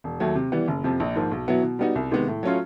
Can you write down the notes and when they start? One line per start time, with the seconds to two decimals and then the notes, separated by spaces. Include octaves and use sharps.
0.04 E1
0.20 D#2 D#3 F#3 A3
0.35 C3
0.52 E3 G3 B3
0.68 F#1
0.84 F2 C3 F3
1.00 A#1
1.15 G#2 F3 A#3
1.32 B1
1.48 B2 F#3 B3 E4
1.63 B2
1.79 G3 B3 D#4 F#4
1.95 C2
2.11 C3 D#3 G#3 B3
2.27 A2
2.43 F#3 A3 C#4 F4